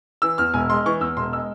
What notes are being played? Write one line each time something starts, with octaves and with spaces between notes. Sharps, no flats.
E3 E6
E2 F6
E1 G#5
G#3 C6
E3 C#6
E2 E6
E1 C6
G#3 E6